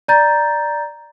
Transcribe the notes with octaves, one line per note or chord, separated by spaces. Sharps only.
D5 A#5 G6 A6